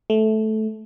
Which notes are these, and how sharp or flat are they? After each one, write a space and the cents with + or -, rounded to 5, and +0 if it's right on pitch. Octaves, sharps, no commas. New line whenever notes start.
A3 -15